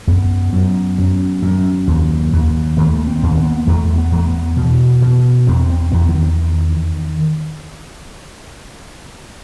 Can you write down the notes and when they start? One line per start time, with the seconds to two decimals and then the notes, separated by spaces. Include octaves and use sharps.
0.07 F#2 B3
0.53 F#2
0.98 F#2
1.42 F#2
1.87 D#2
2.33 D#2
2.77 D#2 A3
3.07 C4
3.23 D#2
3.31 C4
3.38 B3
3.67 E2 A3
3.98 B3
4.12 E2 A3
4.27 B3
4.57 B2
5.02 B2
5.47 E2 C4
5.69 C4
5.92 E2 B3
6.09 E3
6.15 D#3